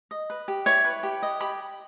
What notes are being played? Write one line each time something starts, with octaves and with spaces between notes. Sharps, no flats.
D#5
B4
G4
E4 C#5 C#6
B4
G4
D#5
G4 B5